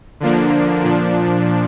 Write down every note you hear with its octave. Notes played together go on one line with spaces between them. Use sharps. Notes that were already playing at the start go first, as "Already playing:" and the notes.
D3 F3 A#3 D4
A#2 F3 D4